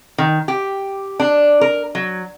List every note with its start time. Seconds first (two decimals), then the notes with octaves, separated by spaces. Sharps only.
0.18 D#3
0.48 G4
1.20 D4
1.61 A#4
1.95 F#3